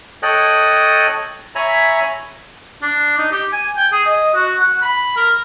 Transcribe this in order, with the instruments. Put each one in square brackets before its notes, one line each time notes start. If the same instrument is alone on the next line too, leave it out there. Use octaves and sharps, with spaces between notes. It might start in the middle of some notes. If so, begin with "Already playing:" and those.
[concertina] A4 C#5 D#5 G5 D#6 F#6
C#5 E5 G#5 A#5 B5
[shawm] D4
D#4
G4
G#5
G5
G#4
D#5
F#4
F#5
B5
A#4